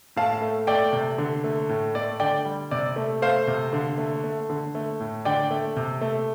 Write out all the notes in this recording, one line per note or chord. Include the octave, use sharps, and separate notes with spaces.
A2 F5 A5
A3
A3 D5 G5
C3
D3
A3
A2
A3 D5
D3 D5 G5
G3
C3 D5
A3
A3 C5 F5
C3
D3
A3
A3
D3
A3
A2
D3 D5 G5
A3
C3
A3